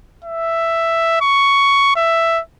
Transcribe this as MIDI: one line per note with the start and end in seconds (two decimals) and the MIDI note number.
0.25 1.20 76
1.21 1.96 85
1.96 2.41 76